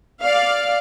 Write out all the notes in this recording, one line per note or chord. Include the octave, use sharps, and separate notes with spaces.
D5 F5